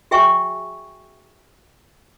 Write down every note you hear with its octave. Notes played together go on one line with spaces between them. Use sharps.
F#4 G#4 E5 G5 G#5 C#6